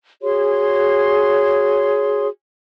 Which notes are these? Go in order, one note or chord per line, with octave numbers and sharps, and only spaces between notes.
F#4 G#4 C#5 C6